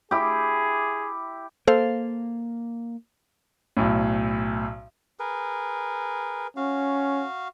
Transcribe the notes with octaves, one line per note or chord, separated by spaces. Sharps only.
E4 G4 G#4
A#3 A4 C5 F5
B1 A2
G#4 A#4 B4
C#4 F#4 F5